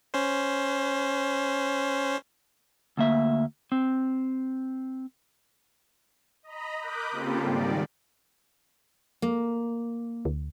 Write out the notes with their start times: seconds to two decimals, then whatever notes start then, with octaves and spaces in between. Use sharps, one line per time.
0.14 C#4 C5
2.97 D2 A#3 E5
3.72 C4
6.43 D#5 A#5 B5
6.81 A#4 B5 D6 D#6 F#6 G6
7.11 C#3 A#3 C4 F4 G4 A4
7.41 G#2 D#3 G3 D5
9.22 A#3
10.25 D2